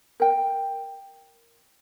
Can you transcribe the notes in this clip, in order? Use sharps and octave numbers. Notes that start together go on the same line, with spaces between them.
A#4 G5